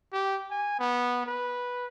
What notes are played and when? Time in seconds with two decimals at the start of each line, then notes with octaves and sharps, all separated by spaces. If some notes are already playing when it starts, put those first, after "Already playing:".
0.13 G4
0.51 G#5
0.79 B3
1.26 B4